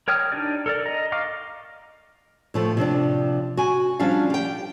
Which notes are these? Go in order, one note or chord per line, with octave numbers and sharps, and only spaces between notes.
A#4 C#5 G5 D#6 F6
D4 D#4 G4 D5
A4 A#4 D5
D#5 A#5
D#5 F5 C#6 D6 F6
A2 F3 A3
C3 F3 D4 D5
F#4 G#5
F3 G3 C#4 D4 F5
G4 G5